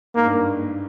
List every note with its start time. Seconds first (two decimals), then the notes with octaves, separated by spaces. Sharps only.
0.15 G#2 A#3
0.26 G2